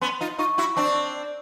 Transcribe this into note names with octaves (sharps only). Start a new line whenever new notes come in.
B3 C#4 C6
D#4 F4
D#4 F4 C#6
E4 F#4
C4 D4 C#6